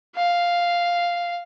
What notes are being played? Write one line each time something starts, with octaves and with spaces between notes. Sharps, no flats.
F5